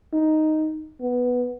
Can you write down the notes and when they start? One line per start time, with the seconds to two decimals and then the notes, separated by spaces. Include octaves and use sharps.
0.13 D#4
1.01 B3